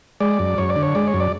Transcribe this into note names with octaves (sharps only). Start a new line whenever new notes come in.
G#3 D5
F#2
F#2 C#5
D5
D3
C#5
G#3 D5
C#5
F#2
D5